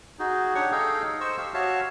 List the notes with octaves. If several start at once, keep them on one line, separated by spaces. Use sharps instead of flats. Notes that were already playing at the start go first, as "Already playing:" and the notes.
D#4 F#4 G#4
D4 G4 C#5 F#5 C#6
D#4 G#4 A4 D#5 F5 G5
C5 D#5 C#6 E6
G4 F5
F#4 C#5 E5 F5 A5